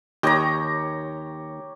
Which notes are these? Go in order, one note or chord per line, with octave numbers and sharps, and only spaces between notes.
D#2 G4 C#5 D#5 G5 A#5